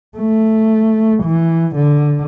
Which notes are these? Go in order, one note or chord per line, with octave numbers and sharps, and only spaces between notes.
A3
E3
D3